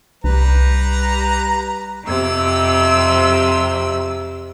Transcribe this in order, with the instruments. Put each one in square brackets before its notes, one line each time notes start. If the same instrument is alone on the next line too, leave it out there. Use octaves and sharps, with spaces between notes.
[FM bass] C2 [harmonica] G3 B4 A#5
[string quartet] F2 C3 E6